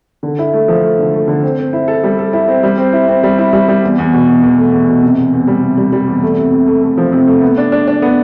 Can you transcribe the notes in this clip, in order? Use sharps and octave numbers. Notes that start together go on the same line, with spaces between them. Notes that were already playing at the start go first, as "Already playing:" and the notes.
D3
E4
A3
F3
A3
D3
A3
D3
C4
C4
E4
A4
G3
A4
E4
C4
G3
C4
E4
C4
G3
E4
G3
G3
E2
E2
B2
E2
E2
A3
E2
B2
C3
E2
E2
G3
C3
G3
G3
E2
A3
C3
C3
A3
A3
F3
C3
A3
B3
D4
D4
D4
B3